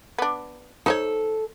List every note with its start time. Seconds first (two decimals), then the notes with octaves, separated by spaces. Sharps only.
0.18 B3 D4
0.86 D#4 A4 C5 C#5